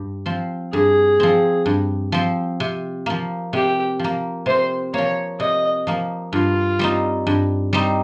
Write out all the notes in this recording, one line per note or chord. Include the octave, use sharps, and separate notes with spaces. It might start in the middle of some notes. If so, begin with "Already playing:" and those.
Already playing: G2
F3 C4
G2 G#4
F3 C4
G2
F3 C4
C3
F3 A#3
C3 G4
F3 A#3
C3 C5
F3 A#3 C#5
C3 D#5
F3 A#3
G2 F4
G3 C4 D#4
G2
G3 C4 D#4